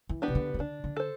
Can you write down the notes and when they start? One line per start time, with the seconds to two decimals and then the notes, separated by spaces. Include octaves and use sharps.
0.09 E3
0.22 B3 D4 G4 B4
0.28 C3
0.35 D3
0.54 E3
0.59 D3 D4
0.84 D3
0.97 A4 C5